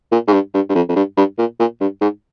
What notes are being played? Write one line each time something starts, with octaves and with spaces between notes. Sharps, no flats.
A#2
G#2
G2
G2
G2
F2
F2
G2
G2
A#2
A#2
G2
G#2